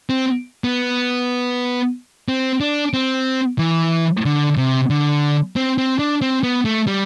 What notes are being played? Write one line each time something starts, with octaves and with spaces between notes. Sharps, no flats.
C4
B3
C4
D4
C4
E3
D3
C3
D3
C4
C4
D4
C4
B3
A3
G3